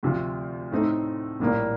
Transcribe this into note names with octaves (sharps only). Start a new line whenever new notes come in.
D2 C3 F3
A2 A3 C4 D#4
A#1 A2 G3 A#3